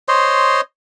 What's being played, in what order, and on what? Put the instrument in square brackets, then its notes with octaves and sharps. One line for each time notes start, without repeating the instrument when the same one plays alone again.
[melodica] C5 C#5 D#5 C6